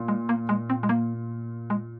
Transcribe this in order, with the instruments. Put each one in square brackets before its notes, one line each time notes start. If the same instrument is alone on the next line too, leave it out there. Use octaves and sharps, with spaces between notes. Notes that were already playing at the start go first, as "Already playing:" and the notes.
Already playing: [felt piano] A#2
[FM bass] G#3
A#3
G#3
C4
G#3
A#3
G#3